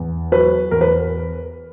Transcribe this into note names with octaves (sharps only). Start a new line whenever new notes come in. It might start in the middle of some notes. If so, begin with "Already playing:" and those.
Already playing: E2
F#3 B4
E2 A#4
B4